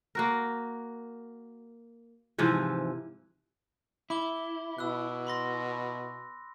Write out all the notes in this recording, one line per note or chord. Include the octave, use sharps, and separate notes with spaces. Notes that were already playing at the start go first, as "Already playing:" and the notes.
A#3 F#4 A#4
G#2 C3 E3 F3
E4 B5 D6 G7
B2 E6 F#6
B5 C6 A#6